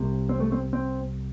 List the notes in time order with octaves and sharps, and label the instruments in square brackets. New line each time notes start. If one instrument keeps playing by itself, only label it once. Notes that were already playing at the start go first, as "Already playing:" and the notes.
Already playing: [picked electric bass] C2 C3
C4
A3
C4
C4